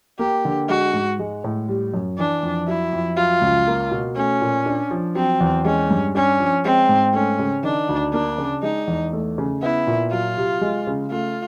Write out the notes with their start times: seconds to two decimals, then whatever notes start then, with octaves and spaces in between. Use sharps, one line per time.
0.19 A#3 G4
0.45 D3
0.69 G#3 F#4
0.93 G#2
1.19 G#3
1.44 A2
1.69 G3
1.94 F#2
2.18 E3 D4
2.43 F2
2.68 F#3 E4
2.93 F2
3.17 F#3 F4
3.42 C#2
3.67 A#3
3.91 B2
4.16 A3 C#4
4.41 A#2
4.66 D4
4.91 F3
5.15 F#3 C4
5.40 E2
5.65 G#3 C#4
5.91 G2
6.15 C#4 D4
6.39 F3
6.65 G#3 C4
6.89 G#2
7.14 A3 C#4
7.39 C#3
7.63 D#3 D4
7.89 D2
8.13 A#3 D4
8.38 C#3
8.63 G#3 D#4
8.87 E2
9.13 A3
9.38 C#3
9.62 B3 E4
9.87 A#2
10.12 F#3 F4
10.37 C3
10.61 G#3
10.87 C#3
11.11 A3 F4